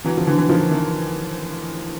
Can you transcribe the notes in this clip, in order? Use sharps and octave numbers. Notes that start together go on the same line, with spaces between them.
E3 F#3
F3
D3 E3
E3
D#3 F3
D#3 F3